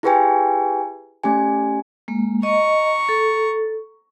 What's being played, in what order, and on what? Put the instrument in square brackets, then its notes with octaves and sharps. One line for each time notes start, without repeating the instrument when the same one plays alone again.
[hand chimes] E4 G4 G#4 B4 G5 G#5
A3 C#4 G4 G#5
[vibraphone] G#3 A#3
[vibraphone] D#5 [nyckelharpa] A#5 C#6
[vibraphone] A4